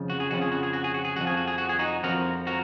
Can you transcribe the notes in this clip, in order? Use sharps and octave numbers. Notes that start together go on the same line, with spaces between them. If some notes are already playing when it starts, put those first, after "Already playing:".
Already playing: F2 C#3 F3
F#4
G#4
F2 C#3 F3 F#4
G#4
F#4
G#4
F#4
G#4
F#4
G#4
F2 F3 F#4
G#4
F#4
G#4
F#4
G#4
D#4 F#4
F2 F3 F#4 A#4
F#4 A#4